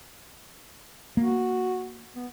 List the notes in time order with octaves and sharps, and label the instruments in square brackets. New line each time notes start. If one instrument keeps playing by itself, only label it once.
[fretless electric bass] A#3 [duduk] F#4
[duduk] B3